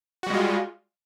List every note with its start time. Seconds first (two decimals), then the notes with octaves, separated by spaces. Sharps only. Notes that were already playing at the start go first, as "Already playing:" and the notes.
0.23 F#4
0.27 G3
0.30 G#3
0.34 F4